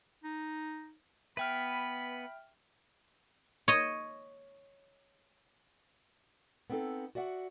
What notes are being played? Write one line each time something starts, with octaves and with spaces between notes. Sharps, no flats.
D#4
B3 B4 E5 G5 B5 F6
C#5 D#5
B3 C4 D#4 G#4 A4
F#4 D5 E5 F#5